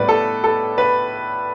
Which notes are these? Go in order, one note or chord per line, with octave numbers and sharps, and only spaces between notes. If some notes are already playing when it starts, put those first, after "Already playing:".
Already playing: A2 G3 B3 B4 D5
A4
A4
B4